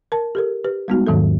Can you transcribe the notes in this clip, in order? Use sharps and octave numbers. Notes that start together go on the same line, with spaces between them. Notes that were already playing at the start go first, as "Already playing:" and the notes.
A#4 A5
G4 A4 A#4
G4 B4
G3 G#3 B3 D#4 F#4
E2 G#2 D#3 F#3 A4